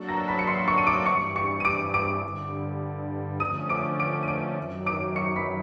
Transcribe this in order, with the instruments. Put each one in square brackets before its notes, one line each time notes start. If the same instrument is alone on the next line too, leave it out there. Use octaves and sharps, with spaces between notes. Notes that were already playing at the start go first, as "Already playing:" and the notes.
Already playing: [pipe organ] F#3 A#3 D4 F#4 A4
[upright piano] A#5 A#6
B5 B6
C#7
C6 C7
C#6 C#7
D#7
D6 D7
[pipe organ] G2 E3 G3 [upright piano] C#6 C#7
[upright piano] C#6 C#7
D#7
D6 D7
D6 D7
[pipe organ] G2 D3 G3
[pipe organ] D3 F3 A3 C#4 [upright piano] D#6 D#7
[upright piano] D6 D7
D6 D7
D#7
D6 D7
[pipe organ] F#2 D#3 F#3
[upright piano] D6 D7
C#6 C#7
B5 B6